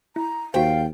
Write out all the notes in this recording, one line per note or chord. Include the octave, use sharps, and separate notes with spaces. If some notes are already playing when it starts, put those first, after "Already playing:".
E4 A#5
D#2 F#4 C5 F5 G5